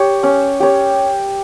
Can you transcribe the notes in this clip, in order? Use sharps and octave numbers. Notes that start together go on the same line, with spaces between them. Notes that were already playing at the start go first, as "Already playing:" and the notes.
Already playing: G4 C#5
C#4
G4 C#5